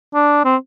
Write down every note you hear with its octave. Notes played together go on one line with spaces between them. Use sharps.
D4
C4